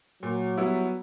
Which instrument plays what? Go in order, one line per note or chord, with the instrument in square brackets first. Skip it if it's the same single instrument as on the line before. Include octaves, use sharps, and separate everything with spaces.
[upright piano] A#2 [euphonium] F#3
[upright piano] G3 B3 E4